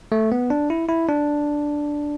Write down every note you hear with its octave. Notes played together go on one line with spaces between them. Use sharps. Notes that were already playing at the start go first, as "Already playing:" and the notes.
A3
B3
D4
E4
E4
D4